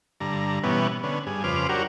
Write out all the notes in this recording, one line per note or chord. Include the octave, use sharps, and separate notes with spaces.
G2 D3 A#5
B2 E3 G3 B3 C#4
D3 B3 C#4
G2 G#4
F2 C#3 B4 C5 D6 F6
F#3 D4 F#4 G4 A#4 C#5